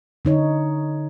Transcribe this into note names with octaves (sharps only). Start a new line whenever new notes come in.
D3 D#4 C#5